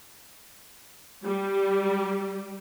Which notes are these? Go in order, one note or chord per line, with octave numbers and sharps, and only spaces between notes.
G3